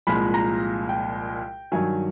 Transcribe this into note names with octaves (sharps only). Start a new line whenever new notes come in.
C2 A#2 F3 G#3 B5
A#5
G5
G2 D#3 F#3 G#5